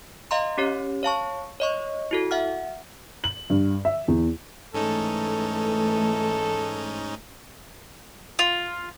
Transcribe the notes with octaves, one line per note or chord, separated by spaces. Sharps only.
D#5 F5 A#5 C6
C#4 G4 C#5
C#5 F5 A5 C#6
C#5 D#5 C#6
E4 F#4 A4
E5 F#5 F6
F#7
G2
E5
E2
G#2 E3 A3 C#4 D#4 A4
F4